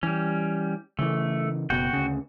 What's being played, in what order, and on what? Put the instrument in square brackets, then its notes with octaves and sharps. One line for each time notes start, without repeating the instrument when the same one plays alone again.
[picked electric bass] E3 [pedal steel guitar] G3 C#4
[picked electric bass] C#3 E3 [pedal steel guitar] A3
[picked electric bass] F#1 B2 [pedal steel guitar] F#4 G5
[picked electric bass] D2 C#3